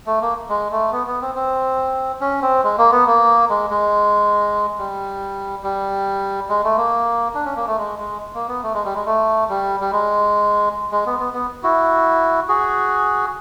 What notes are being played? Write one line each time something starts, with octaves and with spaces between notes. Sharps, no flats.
A3
A#3
G#3
A3
B3
B3
C4
C4
C#4
C4
G#3
A#3
B3
A#3
G#3
G#3
G3
G3
G#3
A3
A#3
D4
C#4
A#3
A3
G#3
G#3
A#3
B3
A3
G#3
G3
G#3
A3
G3
G3
G#3
G#3
B3
B3
B3
E4 F#4
F#4 G#4